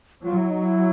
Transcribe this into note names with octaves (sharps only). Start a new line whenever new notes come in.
F#3 F4
E4
D#4
E4